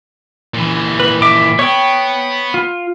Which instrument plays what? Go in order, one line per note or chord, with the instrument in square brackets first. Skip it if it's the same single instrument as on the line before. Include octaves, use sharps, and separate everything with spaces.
[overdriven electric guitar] A#2 E3
[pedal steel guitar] B4
E5 D6
[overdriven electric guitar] B3 [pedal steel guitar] C#5 G5
[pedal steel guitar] F4